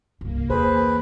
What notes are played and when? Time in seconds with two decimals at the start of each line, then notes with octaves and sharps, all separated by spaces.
0.21 C2 G2 A#3
0.50 E2 G#4 B4 C5